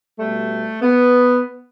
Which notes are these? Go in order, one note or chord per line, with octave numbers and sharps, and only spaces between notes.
B2 G3 A3
B3